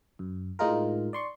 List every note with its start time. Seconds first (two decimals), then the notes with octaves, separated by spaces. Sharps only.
0.19 F#2
0.59 A2 G#3 D#4 F4 A#4
1.13 D5 C6 C#6